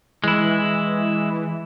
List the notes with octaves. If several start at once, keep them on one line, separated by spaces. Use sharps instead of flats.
E3 G#3 E4